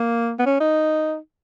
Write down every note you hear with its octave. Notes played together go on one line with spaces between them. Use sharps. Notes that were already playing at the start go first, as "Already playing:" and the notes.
Already playing: A#3
B3
C#4
D#4